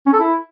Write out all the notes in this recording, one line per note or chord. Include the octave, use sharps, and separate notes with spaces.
C#4
A4
E4